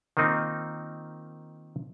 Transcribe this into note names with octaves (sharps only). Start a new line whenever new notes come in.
D#3 A#3 C4 D#4 F4